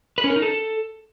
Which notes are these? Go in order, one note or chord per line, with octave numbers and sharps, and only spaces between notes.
B4
C#4
A#4
D#4
A4